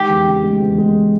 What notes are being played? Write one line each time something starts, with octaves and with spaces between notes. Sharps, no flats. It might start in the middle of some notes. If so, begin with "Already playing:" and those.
Already playing: D#3 G#3 G4
E2
C#3
G#3
E2
G#3